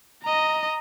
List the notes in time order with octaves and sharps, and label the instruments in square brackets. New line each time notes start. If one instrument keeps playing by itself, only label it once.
[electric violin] D#5 A#5